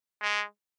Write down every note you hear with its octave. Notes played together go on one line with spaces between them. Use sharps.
G#3